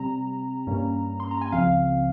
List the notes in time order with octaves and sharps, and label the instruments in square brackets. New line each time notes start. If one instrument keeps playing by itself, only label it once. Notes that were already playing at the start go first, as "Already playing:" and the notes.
Already playing: [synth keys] C3 G3 C4 A#5
G2 G3 A#3 C#4
C6
A#5
G#5
C#2 C#3 F3 C4 F5